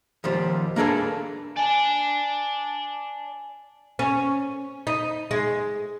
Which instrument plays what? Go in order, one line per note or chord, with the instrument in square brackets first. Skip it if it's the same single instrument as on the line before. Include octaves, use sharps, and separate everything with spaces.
[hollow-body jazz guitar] D#2 F3 G3
A#3 D4 G#4 A4 B4
[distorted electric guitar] D5 A5 [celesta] G#5
[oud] C#4
D#4
G#3